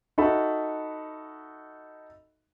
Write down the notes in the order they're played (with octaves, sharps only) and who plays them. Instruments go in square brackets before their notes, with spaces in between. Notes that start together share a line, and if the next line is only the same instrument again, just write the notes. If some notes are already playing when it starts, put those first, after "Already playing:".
[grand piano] D#4 F#4 A4 E5 B5